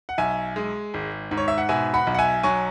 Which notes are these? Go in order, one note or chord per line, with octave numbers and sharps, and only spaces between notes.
F#5
B1 E5 G#5
G#3
G#1
G#2
C#5
E5
F#5
B2 E5 G#5
F#5 B5
B1
F#5
E5 G#5
F#3 G#5 C#6